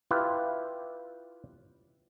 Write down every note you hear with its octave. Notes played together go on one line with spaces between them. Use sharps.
E4 F4 G4 B4